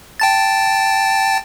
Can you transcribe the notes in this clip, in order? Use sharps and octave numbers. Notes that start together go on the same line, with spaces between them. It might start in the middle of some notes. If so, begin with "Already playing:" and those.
G5 A5 A6